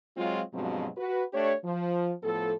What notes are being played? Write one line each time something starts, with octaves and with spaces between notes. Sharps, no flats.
F#3 G#3 C4 F4
G2 B2 F3 F#3 G#3 C4
F#4 B4
A3 D4 G4 C#5
F3
A2 F3 B3 A4